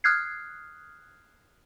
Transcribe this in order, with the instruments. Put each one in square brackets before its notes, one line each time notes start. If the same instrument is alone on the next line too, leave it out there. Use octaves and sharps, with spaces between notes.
[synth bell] D#6 F6 F#6 G#6 C7